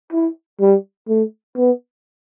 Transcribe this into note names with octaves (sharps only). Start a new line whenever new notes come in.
E4
G3
A3
B3